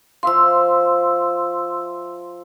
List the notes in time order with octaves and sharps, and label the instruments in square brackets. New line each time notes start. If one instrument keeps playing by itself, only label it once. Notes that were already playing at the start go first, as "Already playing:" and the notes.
[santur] F3 E5 F5 [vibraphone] C6 E6